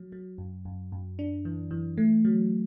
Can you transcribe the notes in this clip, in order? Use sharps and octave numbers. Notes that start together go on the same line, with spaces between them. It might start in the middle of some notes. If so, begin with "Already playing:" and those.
Already playing: F#3
F#3
F#2
F#2
F#2
D4
E3
E3
A3
F#3